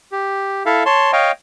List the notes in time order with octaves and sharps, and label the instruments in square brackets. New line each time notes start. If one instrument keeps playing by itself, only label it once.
[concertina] G4
E4 A4 E5 F5
C#5 A5 C6
C#5 D#5 F5 G5